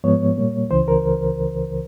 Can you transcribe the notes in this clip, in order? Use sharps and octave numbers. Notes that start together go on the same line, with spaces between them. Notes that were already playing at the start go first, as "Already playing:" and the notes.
G#2 F3 G#3 B3 C#5
A#2 G3 A#3
C#2 C#3 E3 C5
A#4